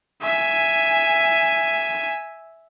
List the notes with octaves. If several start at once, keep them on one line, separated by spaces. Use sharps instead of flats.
E5 G#5